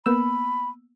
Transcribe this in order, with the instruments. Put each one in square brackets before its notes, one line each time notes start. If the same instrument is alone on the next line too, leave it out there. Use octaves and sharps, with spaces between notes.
[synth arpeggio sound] A#3 B3 E6 [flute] B5